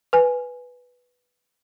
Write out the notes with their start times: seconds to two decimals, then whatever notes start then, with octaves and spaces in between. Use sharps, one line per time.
0.13 B4 G#5